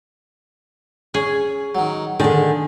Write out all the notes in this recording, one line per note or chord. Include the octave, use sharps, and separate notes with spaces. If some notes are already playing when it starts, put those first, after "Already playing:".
C#4 G#4
D#3 F#3
D3 D#3 G#4 A5